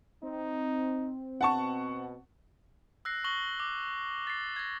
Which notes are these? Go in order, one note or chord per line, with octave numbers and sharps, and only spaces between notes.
C4 D#4
B2 F#5 A5 C#6
E6 F#6 A#6 C7
C#6 A#6 F#7 G7
D6
A6 C7
G#6 A#6